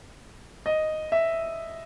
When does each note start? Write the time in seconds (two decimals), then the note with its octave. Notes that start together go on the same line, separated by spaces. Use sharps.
0.66 D#5
1.12 E5